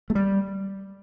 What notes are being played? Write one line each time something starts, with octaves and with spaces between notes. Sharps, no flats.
A3
G3